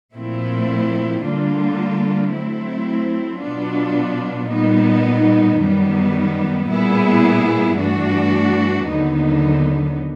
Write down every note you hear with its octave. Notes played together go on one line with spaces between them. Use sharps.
A#2 F3 A3 C4 E4
D3 G3 A#3 D4 F4
F#3 A3 C4 E4
B2 F#3 B3 D4 F4
A#2 G3 B3 D#4
F#2 D#3 G3 B3
A#2 G3 B3 E4 G#4
G2 E3 A3 D4 F#4
D#2 D3 F#3 B3 D#4